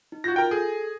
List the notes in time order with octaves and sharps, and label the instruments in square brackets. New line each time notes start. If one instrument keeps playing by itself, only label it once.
[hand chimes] D#4
[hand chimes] F4 G6 A6 [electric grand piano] F#4 A#6
[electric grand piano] A#4 G5
[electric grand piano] G#4 [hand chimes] A4